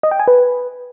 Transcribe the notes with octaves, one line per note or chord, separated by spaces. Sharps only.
D#5
G5
G#5
B4